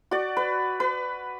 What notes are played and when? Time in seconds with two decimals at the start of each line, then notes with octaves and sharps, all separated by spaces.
0.11 F#4 D5
0.37 B4
0.80 B4